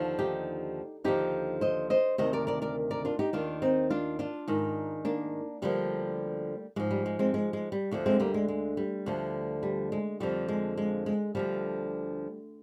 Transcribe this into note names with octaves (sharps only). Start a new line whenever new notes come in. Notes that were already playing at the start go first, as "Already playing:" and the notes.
Already playing: D#2 D3 F3
D#4 G4
D#2 D3 F3 D#4 G4
C5 D#5
C5 D#5
D2 C3 D#3 C5 D#5
A#4 D5
A#4 D5
A#4 D5
A#4 D5
D4 F4
D#4 G4
D#2 D#3 D4 F4
C4 D#4
D4 F4
D4 F4
G#2 D#3
A#3 D4
D2 D3 F3 G3 A#3
G#2 F3 G#3
G3
G#3
G#3 C4
G#3
G#3
G3
D2 D3 F3
G#3 C4
G3 A#3
G#3
G#3
G3
D2 D3 F3
G3
G#3
F2 D3 F3 G3
G#3
G#3
G#3
D2 D3 F3 G3